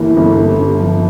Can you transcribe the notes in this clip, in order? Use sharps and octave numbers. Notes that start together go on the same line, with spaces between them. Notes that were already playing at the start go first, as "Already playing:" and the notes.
Already playing: G1 G2 E3 A#3
G1
G2
G2
F3